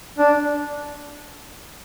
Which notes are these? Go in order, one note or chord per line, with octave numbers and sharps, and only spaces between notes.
D4